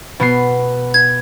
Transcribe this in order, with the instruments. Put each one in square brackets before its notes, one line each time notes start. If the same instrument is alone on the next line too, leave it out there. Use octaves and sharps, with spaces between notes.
[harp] B2 B3 C7
[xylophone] G#6